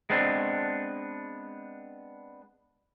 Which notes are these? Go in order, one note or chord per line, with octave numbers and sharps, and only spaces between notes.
G#3 B3 C4 D4